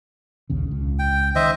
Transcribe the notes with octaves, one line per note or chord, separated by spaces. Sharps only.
A#1 D#2 C#3
C#2 C#3
G5
D#3 C5 D#5 E5